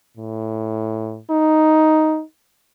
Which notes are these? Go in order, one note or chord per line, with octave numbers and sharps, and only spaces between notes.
A2
D#4